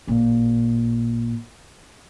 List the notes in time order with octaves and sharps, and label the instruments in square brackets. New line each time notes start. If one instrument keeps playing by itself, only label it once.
[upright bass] A1 A#2